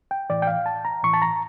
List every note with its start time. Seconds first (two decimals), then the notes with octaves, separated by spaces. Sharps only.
0.11 G5
0.30 A2 E3 D5
0.42 G5
0.47 F5
0.66 A5
0.85 A#5
1.03 A2 E3 C#6
1.13 A5
1.22 A#5